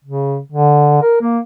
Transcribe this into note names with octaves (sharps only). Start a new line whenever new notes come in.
C#3
D3
A#4
A#3